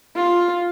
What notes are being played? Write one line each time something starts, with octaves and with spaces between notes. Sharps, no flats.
F4